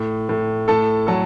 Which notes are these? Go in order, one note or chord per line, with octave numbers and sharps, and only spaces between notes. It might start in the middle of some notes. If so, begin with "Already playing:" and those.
Already playing: A2
A2
A2 A4 A5
F#3 A4 A5